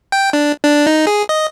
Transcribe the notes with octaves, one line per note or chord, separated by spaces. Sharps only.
G5
D4
D4
D#4
G#4
D#5